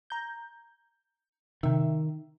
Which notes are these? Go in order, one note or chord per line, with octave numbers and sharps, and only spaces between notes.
A#5 G6
C3 D#3 E5